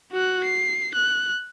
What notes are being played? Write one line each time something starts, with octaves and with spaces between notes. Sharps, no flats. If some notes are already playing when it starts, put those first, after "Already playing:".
F#4 F#6
C7
F#6